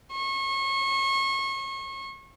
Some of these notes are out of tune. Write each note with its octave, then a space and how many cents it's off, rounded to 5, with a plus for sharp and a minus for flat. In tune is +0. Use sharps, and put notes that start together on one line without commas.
C#6 -35